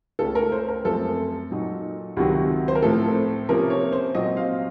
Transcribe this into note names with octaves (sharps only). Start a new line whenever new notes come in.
C#2 C#3 A3 C#4 A4
A#4
C5
A#4
F#2 F3 A3 C4 A4
A#2 F#3 A#3 D#4
C#2 C3 D#3 F#3 F#4
C5
A#4
A2 F3 C4 A4
C3 F3 A#3 C#4 A#4
C#5
C5
A#2 F#3 C4 D#5
F5